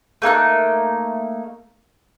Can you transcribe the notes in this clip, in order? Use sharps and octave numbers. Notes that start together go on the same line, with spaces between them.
A3 A#3 D#4 F#6